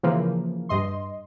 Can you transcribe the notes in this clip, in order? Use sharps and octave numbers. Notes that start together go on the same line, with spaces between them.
C#3 E3 F3 A#3
G2 D#5 C6